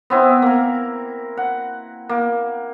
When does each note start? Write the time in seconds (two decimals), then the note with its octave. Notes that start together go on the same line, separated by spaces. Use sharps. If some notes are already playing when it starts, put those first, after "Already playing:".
0.10 B3 C4 E4
0.42 A#3 A#4
1.37 F#5
2.09 A#3